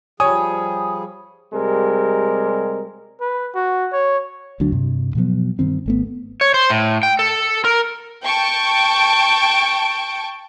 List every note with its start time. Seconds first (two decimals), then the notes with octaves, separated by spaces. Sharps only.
0.20 F3 G3 G#4 C#5 G#5 D#6
1.53 C3 G3 G#3 A#4
3.21 B4
3.55 F#4
3.92 C#5
4.60 D2 D3 F#3 D4
4.72 G2 C3
5.15 B2 F3 F#3 B3
5.59 G2 D#3 C4
5.86 G#1 A3 B3
6.41 C#5
6.54 C5
6.70 A2
7.03 G5
7.19 A4
7.64 A#4
8.23 G5 A5 C#6 D7